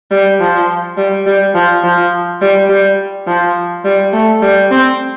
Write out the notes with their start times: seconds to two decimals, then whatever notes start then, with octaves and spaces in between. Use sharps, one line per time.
0.11 G3
0.40 F3
0.97 G3
1.26 G3
1.55 F3
1.83 F3
2.41 G3
2.69 G3
3.27 F3
3.84 G3
4.13 A3
4.42 G3
4.71 C4